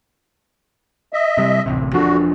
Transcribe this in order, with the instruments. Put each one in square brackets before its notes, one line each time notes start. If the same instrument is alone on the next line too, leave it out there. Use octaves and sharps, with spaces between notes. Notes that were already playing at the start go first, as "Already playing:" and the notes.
[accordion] D#5 E5
[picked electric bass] C3 G3
D1 A1 C3
[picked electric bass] E1 F3 D4 [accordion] D3 F#4